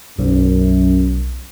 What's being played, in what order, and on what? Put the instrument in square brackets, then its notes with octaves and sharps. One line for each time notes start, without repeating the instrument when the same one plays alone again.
[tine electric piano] B1 [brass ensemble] F#2